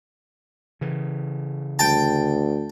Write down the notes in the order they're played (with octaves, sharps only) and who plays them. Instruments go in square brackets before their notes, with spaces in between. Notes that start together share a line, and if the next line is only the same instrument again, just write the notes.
[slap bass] C#3 E3
[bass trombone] D2 [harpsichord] G5 A5